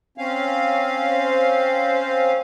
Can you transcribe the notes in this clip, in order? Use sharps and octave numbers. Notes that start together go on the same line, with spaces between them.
C4 C#4 F5
C5